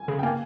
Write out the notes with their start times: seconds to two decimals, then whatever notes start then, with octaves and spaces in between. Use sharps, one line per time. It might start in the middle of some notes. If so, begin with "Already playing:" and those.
Already playing: G#5
0.08 C#3
0.19 G5
0.23 A#3 F5 G#5